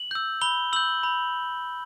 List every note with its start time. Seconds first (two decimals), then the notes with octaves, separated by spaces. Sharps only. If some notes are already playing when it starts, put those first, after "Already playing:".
Already playing: F#7
0.11 E6 G6
0.41 B5 G7
0.73 E6 G6 F#7
1.03 B5